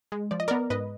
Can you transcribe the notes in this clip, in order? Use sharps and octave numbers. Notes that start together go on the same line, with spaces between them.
G#3
F3 D5
D#5
B3 A#4 D5
G#2 B4 D#5